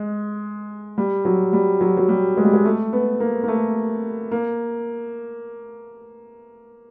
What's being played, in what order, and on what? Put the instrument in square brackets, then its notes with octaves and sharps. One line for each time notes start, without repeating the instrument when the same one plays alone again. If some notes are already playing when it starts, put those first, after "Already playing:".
Already playing: [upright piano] G#3
G3
F#3
G3
F#3
F#3
G3
G#3
G3
G#3
A3
B3
A#3
A#3
A3
A#3